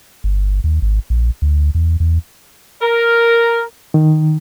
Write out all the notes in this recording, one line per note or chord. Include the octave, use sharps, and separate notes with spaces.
G1
D#2
G#1
A#1
D2
E2
E2
A#4
D#3